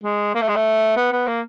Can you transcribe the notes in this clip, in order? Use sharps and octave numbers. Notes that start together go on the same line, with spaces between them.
G#3
A#3
A3
G#3
A3
B3
B3
A#3